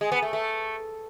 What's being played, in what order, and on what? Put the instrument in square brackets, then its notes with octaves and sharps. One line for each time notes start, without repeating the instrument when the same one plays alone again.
[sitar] G#3
B3
A3
A3